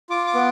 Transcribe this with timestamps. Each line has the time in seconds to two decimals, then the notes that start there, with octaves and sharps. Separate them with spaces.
0.10 F4 D6
0.27 D6
0.35 B3